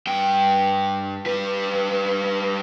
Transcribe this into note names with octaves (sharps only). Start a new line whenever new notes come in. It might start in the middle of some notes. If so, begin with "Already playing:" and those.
G2 G5
G3 B4